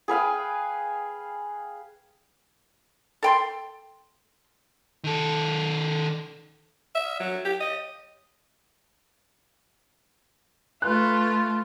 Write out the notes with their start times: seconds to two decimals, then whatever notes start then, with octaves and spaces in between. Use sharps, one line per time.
0.08 G#4 B4 F5 G5
3.23 A4 G5 C6
5.04 D#3 A4
6.95 E5
7.20 F#3
7.45 G4
7.60 D#5
10.82 A3 F4 B4 F#6